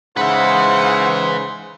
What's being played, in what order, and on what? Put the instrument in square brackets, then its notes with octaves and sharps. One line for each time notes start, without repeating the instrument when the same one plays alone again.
[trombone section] G#2 C#3 C5 [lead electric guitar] B4 E5 [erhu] F#5